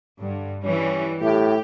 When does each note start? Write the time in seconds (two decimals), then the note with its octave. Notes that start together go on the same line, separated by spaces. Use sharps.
0.21 G2 D3
0.64 E3 G3 C#4
1.21 A2 E4 G4